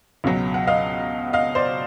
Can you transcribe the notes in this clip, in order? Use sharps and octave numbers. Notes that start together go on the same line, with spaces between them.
C#2 B2 F#3
F#5
D#5 F5
D#5 F5
C5 D5